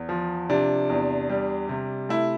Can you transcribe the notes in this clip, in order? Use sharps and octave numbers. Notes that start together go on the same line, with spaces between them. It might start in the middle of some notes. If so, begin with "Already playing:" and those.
Already playing: E2
F3
C3 D4
E2
G3
C3
A3 E4